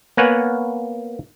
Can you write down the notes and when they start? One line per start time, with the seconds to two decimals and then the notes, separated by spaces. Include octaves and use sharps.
0.17 A#3 B3 B4 C#5 F#5 G#5